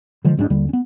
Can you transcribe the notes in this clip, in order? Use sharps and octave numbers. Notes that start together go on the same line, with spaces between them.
D3 E3 F3 G#3
G#1 G#2 D3 D4
D#2 D3 G3
B3 C#4